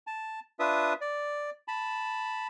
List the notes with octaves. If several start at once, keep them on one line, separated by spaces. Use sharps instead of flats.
A5
D4 F4 B4 E5 D#6
D5
A5 B5